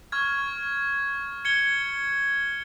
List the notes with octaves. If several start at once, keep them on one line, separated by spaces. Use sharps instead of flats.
C#6 F6 G#6
G#6 C#7 G7